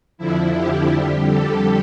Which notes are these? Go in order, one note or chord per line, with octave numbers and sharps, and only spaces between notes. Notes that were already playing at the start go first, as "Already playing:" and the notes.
F2 D3 F3 E4
G4
F2 D3 G3
A4